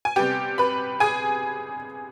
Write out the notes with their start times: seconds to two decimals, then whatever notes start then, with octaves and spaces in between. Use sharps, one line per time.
0.05 G#5
0.16 C3 G3 B3 G4 G5
0.58 B4 B5
1.00 G#4 G#5